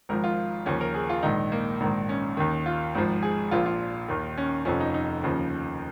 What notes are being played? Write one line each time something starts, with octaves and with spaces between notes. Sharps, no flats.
G#1 G#2 F3 A#4
F4
D#2 C#3 F3 C#4
A#4
G#4
F4
A#1 G#2 D#3 D#4
A#3
A#1 G#2 D#3
C#4
D#2 D#3
F4
G#1 G#2 F3
G#4
A#1 A#2 F3 F4
F4
D#2 D#3
C#4
F1 F2 F3 C#4
D#4
D#4
D#2 C#3 F3